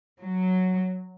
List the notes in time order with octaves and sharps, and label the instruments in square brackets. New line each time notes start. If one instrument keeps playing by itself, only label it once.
[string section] F#3